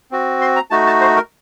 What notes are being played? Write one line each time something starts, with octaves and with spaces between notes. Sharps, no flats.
C4 F#4
C6
A#5
A3 D#4 F#4 A5
A5
C5
A#4